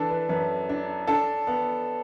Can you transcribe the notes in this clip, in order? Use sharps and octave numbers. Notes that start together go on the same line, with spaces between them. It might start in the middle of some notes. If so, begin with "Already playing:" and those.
Already playing: E3 D4 A4 B4
B4
F#2 B4
D4
D4 A4
B3